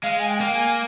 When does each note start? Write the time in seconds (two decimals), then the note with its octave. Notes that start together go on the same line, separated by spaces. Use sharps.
0.03 G#3 F5
0.19 G#5
0.28 G5
0.41 A#3
0.54 G#5